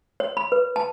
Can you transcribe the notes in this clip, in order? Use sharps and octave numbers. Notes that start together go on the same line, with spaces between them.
C#5
B5
B4
A5